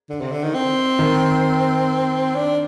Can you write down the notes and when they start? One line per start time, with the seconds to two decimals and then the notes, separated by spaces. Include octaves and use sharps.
0.09 D3
0.21 C3
0.32 D3
0.43 D#3
0.54 C4
0.99 D#3
2.35 D4